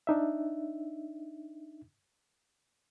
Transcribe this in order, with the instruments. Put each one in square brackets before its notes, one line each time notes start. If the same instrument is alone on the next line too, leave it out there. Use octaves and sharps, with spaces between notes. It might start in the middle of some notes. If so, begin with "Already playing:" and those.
[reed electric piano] D4 D#4 E5